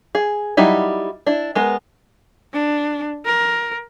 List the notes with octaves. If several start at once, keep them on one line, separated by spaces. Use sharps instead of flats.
G#4
F#3 G3 D#4 E4
D4 E4
G#3 B3 A#4
D4
A#4